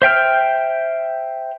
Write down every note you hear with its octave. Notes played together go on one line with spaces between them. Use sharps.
C5 E5 G5 F6